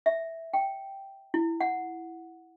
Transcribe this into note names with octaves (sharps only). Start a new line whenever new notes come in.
E5
G5
E4
F#5